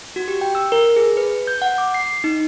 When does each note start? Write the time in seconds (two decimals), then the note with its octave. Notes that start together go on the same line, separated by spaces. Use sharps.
0.16 F#4
0.28 G4
0.41 G5
0.55 E6
0.72 A#4
0.96 G#4
1.17 B4
1.47 G6
1.62 F#5
1.78 D6
1.94 C7
2.24 D#4